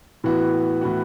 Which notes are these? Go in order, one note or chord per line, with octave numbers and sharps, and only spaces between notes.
A2 E3 B3 F#4
A2 E3 B3 F#4